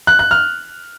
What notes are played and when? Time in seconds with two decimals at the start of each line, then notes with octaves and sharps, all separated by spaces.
0.07 F#6
0.19 F#6
0.31 F6